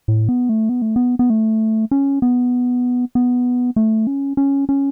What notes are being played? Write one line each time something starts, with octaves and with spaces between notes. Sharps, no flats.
A2
B3
A3
B3
A3
B3
B3
A3
C#4
B3
B3
A3
C#4
C#4
C#4